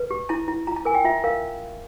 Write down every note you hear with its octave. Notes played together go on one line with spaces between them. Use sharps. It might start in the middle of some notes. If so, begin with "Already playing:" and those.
Already playing: B4
G4
E4 A5
E4
F4 A#5
A5
A#4 G#5
G5
F4 E5
A#4 F5